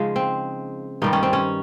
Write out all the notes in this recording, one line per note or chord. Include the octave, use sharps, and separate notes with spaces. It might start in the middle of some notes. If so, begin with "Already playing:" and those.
Already playing: C#3 F3 G#3 D#4
C4
G2 D#3 G3 C4 D#4
C#4
C4
C#4